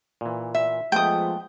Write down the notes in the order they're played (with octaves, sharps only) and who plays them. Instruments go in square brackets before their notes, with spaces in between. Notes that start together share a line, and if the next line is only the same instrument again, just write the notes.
[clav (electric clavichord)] A#2 E3
[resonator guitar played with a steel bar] E5
[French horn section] F3 G#3 [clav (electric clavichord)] A3 B3 [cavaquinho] G5 D#6